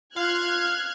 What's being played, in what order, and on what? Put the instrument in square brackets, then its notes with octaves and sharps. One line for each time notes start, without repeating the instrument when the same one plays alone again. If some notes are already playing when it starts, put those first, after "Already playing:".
[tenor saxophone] F4 [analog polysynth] F5 [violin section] F6 F#6 G#6